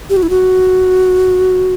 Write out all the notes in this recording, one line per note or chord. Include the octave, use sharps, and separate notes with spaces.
G4
F#4
E4
F#4